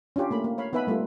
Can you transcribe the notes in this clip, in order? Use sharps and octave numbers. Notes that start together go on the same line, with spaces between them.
C#4 D4 F4 G4
A3 A#3 B5
A#3
C#5 F5 B5
B3 D#4 B4 E5 G#5 B5
G3 A3 A#3 F4